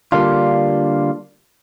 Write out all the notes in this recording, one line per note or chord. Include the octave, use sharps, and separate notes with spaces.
D3 G3 A#3 D4 F4